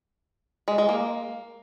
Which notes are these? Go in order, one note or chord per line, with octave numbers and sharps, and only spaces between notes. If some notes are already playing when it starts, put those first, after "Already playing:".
G#3
G#3
A#3